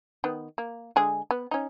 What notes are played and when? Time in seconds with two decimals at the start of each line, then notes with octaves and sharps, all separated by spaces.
0.24 D#3 B3
0.58 A#3
0.96 D3 G#3 G#4
1.31 B3
1.51 C#4 D#4